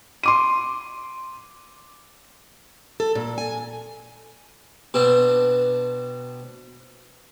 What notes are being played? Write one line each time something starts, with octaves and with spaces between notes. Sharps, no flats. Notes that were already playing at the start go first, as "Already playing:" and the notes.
C6 D6 D#7
A4
A#2
G#5
B2 C4 D4